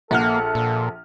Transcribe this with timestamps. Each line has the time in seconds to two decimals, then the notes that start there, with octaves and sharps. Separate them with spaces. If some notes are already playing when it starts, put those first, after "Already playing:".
0.11 A#1 A#3 A4 F#5 F6
0.55 A#2